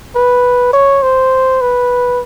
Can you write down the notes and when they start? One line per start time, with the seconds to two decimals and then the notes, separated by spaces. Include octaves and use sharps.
0.16 B4
0.73 C#5
1.03 C5
1.61 B4